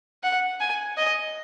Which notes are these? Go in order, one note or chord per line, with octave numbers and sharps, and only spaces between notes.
F#5
G#5
D#5